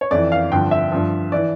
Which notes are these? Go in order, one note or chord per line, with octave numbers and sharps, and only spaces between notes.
C#5
F2 E3 D5
F5
G2 D3 F3 G5
E5
G2 F3
E3 D5